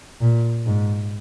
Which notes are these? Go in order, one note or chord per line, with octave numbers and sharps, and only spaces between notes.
A#2
G#2